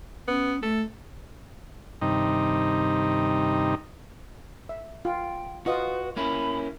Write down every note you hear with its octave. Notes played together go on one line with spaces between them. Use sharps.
B3 C#4
A3 A4
G2 C3 D#3 D#4
E5
F4 G5
F4 F#4 B4 D#5
A#3 C#4 E4 B5